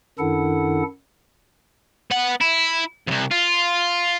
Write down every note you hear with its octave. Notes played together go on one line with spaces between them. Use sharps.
F#2 D#3 D4 E4 A4 F#5
B3 F#5
E4
C2 F2
F4